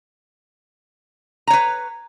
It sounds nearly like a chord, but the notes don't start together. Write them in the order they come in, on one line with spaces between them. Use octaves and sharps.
A#5 C#5 B4